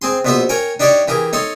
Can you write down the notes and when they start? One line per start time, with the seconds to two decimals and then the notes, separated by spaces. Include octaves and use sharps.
0.02 C4 G#4 C6
0.25 A#1 B2 B3 B4 C5 E5
0.49 A#4 C#5 G5 G#5
0.80 D4 D#4 G4 C#5 D5 C#6
1.08 E3 G4 G#4 A#4
1.33 D#4 A4 C#5 C6